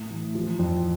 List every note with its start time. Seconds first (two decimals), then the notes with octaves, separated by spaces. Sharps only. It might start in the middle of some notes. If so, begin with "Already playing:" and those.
Already playing: A2
0.11 E3
0.35 F3
0.59 F2